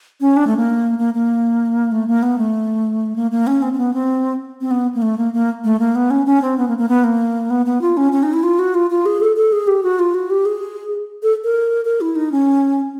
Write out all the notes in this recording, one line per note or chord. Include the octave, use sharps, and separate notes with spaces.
C#4
D4
A3
A#3
A#3
A#3
A3
A#3
B3
A3
A#3
A#3
C#4
C4
C4
B3
C4
C4
B3
A#3
A3
A#3
A#3
A3
A#3
B3
C#4
C#4
C4
B3
A#3
A#3
B3
A#3
B3
B3
F4
C#4
C#4
D#4
E4
F4
F#4
F4
F4
G#4
A4
A4
G#4
G4
F#4
F4
F#4
G4
G#4
A4
A#4
A#4
E4
D#4
C#4